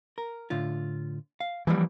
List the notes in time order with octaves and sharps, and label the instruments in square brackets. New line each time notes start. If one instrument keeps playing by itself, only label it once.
[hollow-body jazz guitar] A#4
A2 D3 F4
F5
[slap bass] E3 G3 [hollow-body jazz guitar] F3 A#3